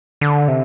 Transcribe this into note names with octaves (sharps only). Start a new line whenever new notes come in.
D3
C3